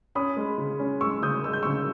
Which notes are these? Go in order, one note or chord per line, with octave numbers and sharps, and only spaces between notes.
C#4 B5 D#6
G#3
C#3
C#4
G#3 C#6 E6
C#3 D#6 G6
G#3 E6
G6
C#3 C#6 E6